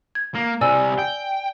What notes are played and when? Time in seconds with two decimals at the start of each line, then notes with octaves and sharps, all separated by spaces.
0.15 G#6
0.35 A#3
0.61 C2 C3 D5 G#5 E6
0.99 G5